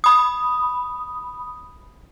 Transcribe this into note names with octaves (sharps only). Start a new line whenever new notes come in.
B5 D#6